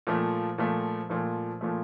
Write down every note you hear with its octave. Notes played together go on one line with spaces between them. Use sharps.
A#2 F3 A3
A#2 F3 A3
A#2 F3 A3
A#2 F3 A3